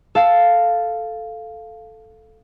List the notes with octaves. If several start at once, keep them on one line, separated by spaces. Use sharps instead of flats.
A4 F5